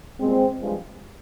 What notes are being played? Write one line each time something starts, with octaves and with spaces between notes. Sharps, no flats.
A#2 G3 G#3 C4
G2 F3 G#3